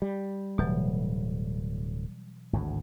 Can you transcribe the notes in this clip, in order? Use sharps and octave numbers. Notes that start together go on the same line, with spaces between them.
G3
D1 B2 E3 F#3
G#1 D2 A2